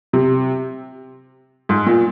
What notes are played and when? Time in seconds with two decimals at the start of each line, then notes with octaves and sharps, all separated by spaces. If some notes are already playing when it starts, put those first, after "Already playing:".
0.13 C3
1.69 G#2
1.86 A#2